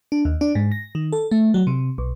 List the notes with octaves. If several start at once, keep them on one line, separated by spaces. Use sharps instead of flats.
D4
D#2
D4
G#2
A#6
D#3
A4
A3
F#3
C3
B1